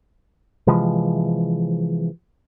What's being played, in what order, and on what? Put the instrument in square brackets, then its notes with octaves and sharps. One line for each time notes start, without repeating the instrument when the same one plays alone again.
[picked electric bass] C3 E3 F3 G#3